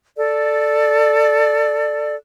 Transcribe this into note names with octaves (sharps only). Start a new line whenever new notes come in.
A4 D5